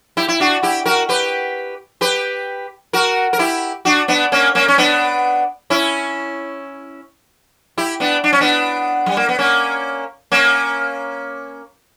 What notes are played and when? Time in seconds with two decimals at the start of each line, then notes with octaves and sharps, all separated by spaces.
0.17 E4 G4
0.28 E4
0.40 D4 F#4
0.63 E4 G4
0.86 F#4 A#4
1.09 G4 B4
2.01 G4 B4
2.93 F#4 A#4
3.33 A#4
3.39 E4 G4
3.85 D4 F#4
4.08 B3 D4
4.32 A#3 C#4
4.55 A#3 C#4
4.68 C#4
4.78 B3 D4
5.70 C#4 E4
7.78 E4 G4
8.00 B3 D4
8.24 D4
8.33 C#4
8.41 B3 D4
9.06 G3
9.17 A#3
9.29 B3
9.39 A#3 C#4
10.32 A#3 C#4